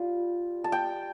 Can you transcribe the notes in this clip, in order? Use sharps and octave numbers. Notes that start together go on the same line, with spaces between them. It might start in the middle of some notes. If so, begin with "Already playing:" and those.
Already playing: G3 F4
A5
G5